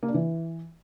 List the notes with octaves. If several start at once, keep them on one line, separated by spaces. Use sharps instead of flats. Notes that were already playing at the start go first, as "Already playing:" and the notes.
A#3
D4
E3